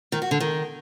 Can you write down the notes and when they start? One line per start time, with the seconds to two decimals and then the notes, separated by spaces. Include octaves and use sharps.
0.12 D#3
0.22 F#4
0.31 D3
0.40 D#3